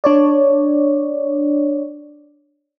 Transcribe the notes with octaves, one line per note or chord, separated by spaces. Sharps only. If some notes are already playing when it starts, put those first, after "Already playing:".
D4 C#5 D5